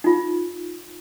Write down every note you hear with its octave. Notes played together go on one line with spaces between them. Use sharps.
D#4 F4